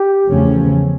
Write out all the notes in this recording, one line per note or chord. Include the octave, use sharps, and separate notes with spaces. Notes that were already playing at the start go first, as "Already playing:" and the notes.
Already playing: G4
E2 C#3 F3 A3 C#4